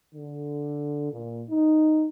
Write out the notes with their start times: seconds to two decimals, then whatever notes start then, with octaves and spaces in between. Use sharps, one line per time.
0.15 D3
1.12 A#2
1.49 D#4